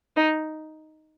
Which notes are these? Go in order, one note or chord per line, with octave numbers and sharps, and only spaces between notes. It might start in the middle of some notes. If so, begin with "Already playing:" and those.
D#4